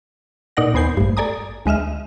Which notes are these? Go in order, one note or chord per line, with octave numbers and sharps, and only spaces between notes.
A#2 D#4 D5 F#5 A#6
D#2 B3 C5 G#5 G6 C7
A1 G2
A4 D5 G#5 A#5 D#6
D2 G#3 D#5 E5 F6